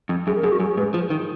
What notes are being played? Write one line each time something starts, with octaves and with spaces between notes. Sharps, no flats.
F2
F#2 G#4
A#4
F#2 G#4
F#4
F#2 G#4
G#2 B4
F3
D#3